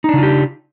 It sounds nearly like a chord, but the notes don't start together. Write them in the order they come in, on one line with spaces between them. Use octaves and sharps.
D#4 D4 C#3 F4 G4